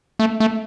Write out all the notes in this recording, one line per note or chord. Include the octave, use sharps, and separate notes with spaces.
A3
A3